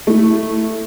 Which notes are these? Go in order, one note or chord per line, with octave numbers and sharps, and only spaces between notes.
A3 E4